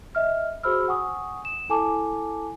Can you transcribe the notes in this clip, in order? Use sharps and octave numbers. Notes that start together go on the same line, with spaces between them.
D#5 E5 F6
F#4 G#4 C5 B5 E6 F6
F#5 G#5 C#6 D#6
E7
E4 A4 G#5 A5 D6